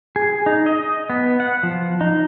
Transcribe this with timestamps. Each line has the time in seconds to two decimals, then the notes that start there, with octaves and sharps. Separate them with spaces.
0.16 G#4
0.46 D#4
0.66 D#5
1.10 B3
1.40 F#5
1.63 F3
2.01 D#4